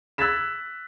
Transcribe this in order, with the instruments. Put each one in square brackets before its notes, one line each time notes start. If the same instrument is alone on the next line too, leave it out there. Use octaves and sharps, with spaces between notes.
[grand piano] E6 F#6 G#6 A6 B6 E7